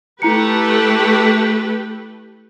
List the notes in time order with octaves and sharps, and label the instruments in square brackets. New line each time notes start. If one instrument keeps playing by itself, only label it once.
[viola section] A3 G4 B4 [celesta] E4 A#5 C#7